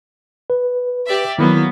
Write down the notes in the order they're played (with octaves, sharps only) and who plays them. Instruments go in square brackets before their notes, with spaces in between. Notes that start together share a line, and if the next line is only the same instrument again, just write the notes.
[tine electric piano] B4
[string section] G4 D5 E5
[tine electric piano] D#3 E4 [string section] F#3 A#3 B3